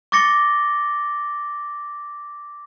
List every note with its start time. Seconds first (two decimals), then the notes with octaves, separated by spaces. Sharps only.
0.12 C#6 D6 A6 A#6 C#7 G7